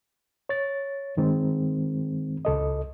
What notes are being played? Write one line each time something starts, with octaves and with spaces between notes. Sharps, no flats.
C#5 A6
G2 D#3 G#3 C4
C#2 A4 D#5